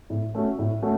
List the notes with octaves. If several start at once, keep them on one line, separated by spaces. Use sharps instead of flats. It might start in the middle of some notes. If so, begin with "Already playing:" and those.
A2
A3 C#4 F#4
A2
A3 C#4 F#4